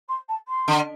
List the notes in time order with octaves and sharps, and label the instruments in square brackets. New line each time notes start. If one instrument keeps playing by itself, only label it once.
[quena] C6
A5
C6
[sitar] D3